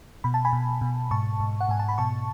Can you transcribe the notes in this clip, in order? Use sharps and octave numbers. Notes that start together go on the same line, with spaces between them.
B2 B5
A5
G#5 B5
B2
B2
G#2 A5 C#6
G#2
F#5
G#2 G#5
A5
B5
B2 A5 C#6